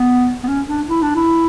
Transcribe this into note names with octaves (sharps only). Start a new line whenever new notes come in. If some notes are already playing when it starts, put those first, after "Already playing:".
Already playing: B3
B3
C#4
D4
E4
D4
E4